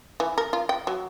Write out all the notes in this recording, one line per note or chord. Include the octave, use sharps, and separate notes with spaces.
E3
A#4
F4
G5
F#3